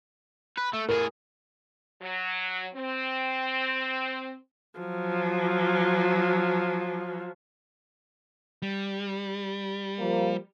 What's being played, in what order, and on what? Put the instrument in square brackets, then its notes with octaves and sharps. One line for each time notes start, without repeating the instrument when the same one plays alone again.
[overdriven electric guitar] B4
A3
[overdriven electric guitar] A2 G#4 [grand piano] A#4
[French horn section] F#3
C4
[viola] F3 F#3
[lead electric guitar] G3
[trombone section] F3 A#3